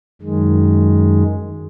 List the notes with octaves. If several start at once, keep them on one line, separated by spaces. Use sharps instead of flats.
F#2 D#3 G#3